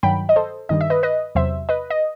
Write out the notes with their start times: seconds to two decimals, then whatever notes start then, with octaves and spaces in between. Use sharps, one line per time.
0.03 G2 D#3 F#3 G5 B5
0.29 D#5
0.36 A4 C5
0.69 G2 D#3 G3 D#5
0.81 E5
0.90 B4 D#5
1.03 B4 D#5
1.35 E2 C3 F#3 C5 E5
1.69 B4 D#5
1.90 D#5